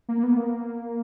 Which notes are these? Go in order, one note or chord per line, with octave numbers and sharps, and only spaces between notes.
A#3
B3
A#3